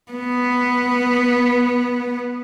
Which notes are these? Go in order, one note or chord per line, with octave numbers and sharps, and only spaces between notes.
B3